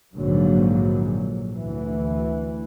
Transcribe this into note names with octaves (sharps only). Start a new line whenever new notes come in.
A#1 G#2 D3 F#3 A#3
D2 E3